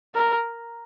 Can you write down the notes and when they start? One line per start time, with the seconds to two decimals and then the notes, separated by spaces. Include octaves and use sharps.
0.14 A#4